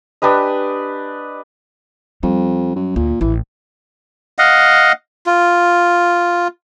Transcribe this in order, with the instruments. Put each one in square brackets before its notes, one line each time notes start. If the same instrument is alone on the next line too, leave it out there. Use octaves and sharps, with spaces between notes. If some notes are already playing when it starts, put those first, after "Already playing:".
[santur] D4 G4 B4 D#5
[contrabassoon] F2 [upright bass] G3
[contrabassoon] F#2
[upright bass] D2 [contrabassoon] A#2
[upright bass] A1 [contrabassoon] E3
[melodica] D#5 F5 F#5
F4